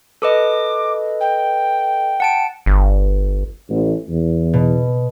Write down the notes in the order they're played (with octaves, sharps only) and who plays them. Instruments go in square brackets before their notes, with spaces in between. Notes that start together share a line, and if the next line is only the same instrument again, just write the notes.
[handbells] A4 B4 D#5 [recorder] D6
[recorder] G5
[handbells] F#5 A5 D7
[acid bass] G1
[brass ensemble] A1
E2
[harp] B2